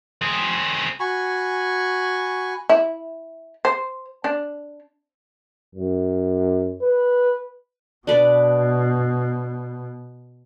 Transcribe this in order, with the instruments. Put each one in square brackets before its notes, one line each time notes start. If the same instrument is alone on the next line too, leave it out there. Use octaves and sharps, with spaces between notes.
[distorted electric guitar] C4 G#4
[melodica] F#4 G#5 B5 C#6
[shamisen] E4
C5
D4
[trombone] F#2
B4
[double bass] B2 [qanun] D4 B4 D5